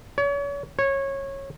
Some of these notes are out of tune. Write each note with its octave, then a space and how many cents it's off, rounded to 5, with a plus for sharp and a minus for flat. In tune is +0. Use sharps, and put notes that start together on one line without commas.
C#5 +35
C#5 -20